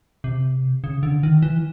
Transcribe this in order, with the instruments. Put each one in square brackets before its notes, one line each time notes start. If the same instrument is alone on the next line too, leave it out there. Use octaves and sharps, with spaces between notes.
[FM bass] C3
C#3
D3
D#3
E3